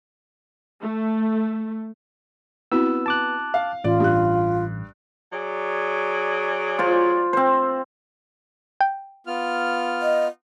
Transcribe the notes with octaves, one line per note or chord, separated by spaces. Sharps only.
A3
B3 C4 E4 F#4 E6
A5 D6 F#6
F5
A1 F4 D5
G2 G4 F#6
F#3 G#4 D5
F4 C5
C4 C5
G5
B3 F4 F6
D#5